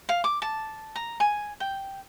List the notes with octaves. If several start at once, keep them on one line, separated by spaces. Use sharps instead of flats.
F5
D6
A5
A#5
G#5
G5